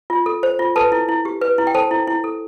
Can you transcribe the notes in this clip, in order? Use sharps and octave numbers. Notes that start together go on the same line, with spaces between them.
F4
A4
C5
F4
A4 B4 A5
E4
E4
G4
B4
E4
G5
A4 C5 A5
E4
E4
A4